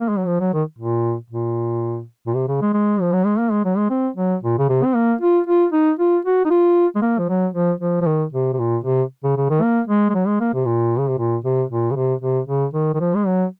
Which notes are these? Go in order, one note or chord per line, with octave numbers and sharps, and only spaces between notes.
A#3
G#3
F#3
F3
F#3
D#3
A#2
A#2
A#2
C3
C#3
G#3
G#3
F3
F#3
G#3
A#3
G#3
F#3
G#3
C4
F#3
A#2
C#3
C3
C4
A#3
F4
F4
D#4
F4
F#4
D#4
F4
G#3
A#3
F3
F#3
F3
F3
F3
D#3
C3
C3
A#2
C3
C#3
C#3
D#3
A#3
G#3
G#3
F#3
G#3
A#3
C3
A#2
C#3
C3
A#2
C3
A#2
C#3
C3
C3
C#3
D#3
D#3
F3
G#3
F#3